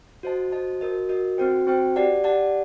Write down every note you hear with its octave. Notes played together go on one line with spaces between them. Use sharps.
F#4 C5 D#5 A5
F#4 C5 D#5 A5
F#4 A#4 D#5
F#4 A#4 D#5
C4 F#4 C5 G5
C4 F#4 C5 G5
G4 D5 F#5 A5
G4 D5 F#5 A5